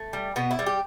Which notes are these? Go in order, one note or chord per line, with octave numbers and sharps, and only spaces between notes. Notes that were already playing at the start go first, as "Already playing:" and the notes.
Already playing: A3
G3
B2 B3
E4
G3
G4